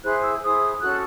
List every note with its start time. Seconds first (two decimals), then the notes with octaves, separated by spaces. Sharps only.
0.02 E4 G#4 C5 F#6
0.22 E6
0.42 E4 G#4 C5 D#6
0.81 C#4 F#4 A4 F#6